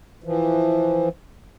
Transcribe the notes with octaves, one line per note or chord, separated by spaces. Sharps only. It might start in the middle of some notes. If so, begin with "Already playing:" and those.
E3 F3